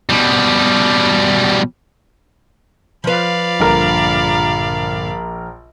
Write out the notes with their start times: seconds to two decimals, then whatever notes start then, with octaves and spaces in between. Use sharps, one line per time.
0.10 B2 G3
3.04 F3 B4 D5 F5 B5
3.60 A#1 G2 A#2 D3 A#4